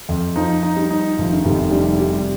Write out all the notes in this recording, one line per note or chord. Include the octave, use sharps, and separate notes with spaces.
F2
F3 D#4
D#4
G3
D#4
F1 F3
D#3
F1 C3
D#3 G3
C3 G3